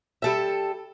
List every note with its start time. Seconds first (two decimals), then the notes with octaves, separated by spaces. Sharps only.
0.22 G3 A4 E5